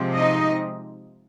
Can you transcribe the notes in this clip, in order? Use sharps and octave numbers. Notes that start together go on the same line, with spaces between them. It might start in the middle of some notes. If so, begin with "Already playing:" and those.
Already playing: C3 F3 G#3 C4
D#4 D#5